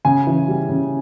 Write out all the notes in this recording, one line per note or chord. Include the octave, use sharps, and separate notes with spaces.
C#3 G#5
E3
G3
C#3